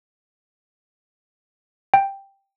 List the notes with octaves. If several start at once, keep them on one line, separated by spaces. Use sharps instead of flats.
G5